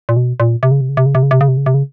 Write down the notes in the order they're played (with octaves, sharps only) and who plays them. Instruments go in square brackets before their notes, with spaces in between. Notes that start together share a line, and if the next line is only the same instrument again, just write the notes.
[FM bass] A#2
B2
A#2
C3
C#3
C3
C#3
C3
C#3
C3
C#3
C3
C#3
C3
C#3
C3
C#3